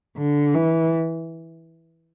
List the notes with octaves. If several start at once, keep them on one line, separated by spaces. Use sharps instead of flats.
D3
E3